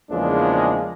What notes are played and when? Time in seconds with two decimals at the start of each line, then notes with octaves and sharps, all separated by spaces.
0.11 E2 C#3 F3 G#3 A#3 D4